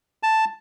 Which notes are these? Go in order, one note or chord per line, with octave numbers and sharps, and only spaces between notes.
A5